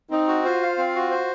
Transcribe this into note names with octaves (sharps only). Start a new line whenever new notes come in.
C4 D#4
F#4
F4 C5
F5
C4
F#4
C5